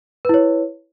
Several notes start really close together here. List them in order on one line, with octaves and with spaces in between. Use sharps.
B4 E4 C#5